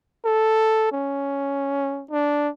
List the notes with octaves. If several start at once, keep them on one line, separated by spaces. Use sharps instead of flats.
A4
C#4
D4